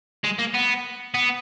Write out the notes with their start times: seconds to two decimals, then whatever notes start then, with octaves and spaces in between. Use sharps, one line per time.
0.24 G#3
0.39 A#3
0.55 B3
1.14 B3